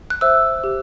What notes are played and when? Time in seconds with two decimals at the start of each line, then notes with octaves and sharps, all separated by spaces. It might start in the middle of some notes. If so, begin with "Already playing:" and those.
0.10 F#6
0.21 C5 E5 E6
0.64 G4